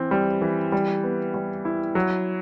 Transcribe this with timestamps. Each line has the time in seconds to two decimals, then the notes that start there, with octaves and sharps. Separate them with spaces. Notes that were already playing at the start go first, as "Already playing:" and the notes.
Already playing: E3 C4
0.11 G3
0.42 E3
0.72 G3
1.03 B3
1.34 G3
1.65 E4
1.95 F#3